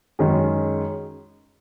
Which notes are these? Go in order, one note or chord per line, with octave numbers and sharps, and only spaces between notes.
F#2 D#3 G#3 C#4 G#4